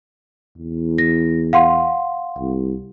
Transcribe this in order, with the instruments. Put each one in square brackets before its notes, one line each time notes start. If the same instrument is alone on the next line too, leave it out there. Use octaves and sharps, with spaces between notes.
[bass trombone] E2
[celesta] A#6
F5 F#5 C6
[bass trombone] C2